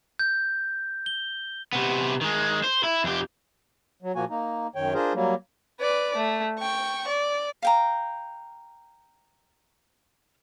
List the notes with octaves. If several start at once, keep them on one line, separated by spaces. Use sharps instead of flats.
G6
G7
C3 B3
D#3 G#3
C5
E4
F2 G4
F#3
A#2 F3 A#3 F#4 G#5
A#3 D#4
F#2 D#3 C#5 G5
D4 F4 G#4 A#4 C5
F#3 G3 A#3
B4 D5
A3
G5 C#6
D5
F5 G5 A#5